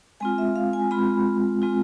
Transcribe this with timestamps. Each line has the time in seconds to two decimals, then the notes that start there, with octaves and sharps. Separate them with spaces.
0.20 G#3 C4 F4 G#5
0.38 E5
0.56 F5
0.73 G#5
0.91 G#3 C4 F4 B5
1.62 G#3 C4 F4